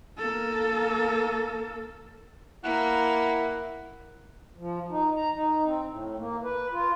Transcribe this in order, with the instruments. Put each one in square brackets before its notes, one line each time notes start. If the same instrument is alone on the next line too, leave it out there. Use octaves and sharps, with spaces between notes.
[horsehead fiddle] A#3 A4
[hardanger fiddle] A#3 [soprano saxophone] E4 [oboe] F#5
[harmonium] F3
D#4
A#5
D#4
C4
A2
A#3
B4
F4